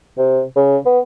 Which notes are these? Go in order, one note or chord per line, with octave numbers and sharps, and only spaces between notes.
C3
C#3
B3